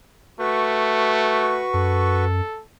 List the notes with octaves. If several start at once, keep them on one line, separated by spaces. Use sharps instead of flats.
A3 F#4 B4 C#6
F#2 A4